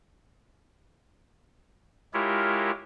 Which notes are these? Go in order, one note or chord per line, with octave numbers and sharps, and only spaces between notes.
G#3 E4 F4 G4 A#4 C#5